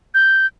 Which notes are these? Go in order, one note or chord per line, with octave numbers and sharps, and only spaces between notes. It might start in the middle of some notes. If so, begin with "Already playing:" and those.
G6